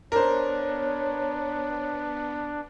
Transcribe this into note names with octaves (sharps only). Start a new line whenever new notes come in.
B3 D4 A#4 C5 C#5